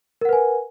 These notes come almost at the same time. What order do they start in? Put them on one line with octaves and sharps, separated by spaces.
A#4 F#5 B4 G#5